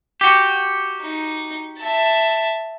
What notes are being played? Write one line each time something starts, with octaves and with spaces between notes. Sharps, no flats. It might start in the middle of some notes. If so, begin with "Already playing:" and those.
F#4 G4
D#4
E5 A5